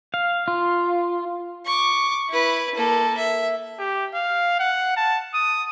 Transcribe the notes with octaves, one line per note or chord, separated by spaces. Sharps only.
F5
F4
C#6 D6
E4 B4
A#3 A4
E5
G4
F5
F#5
A5
D#6